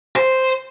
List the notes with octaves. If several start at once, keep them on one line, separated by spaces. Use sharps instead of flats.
C5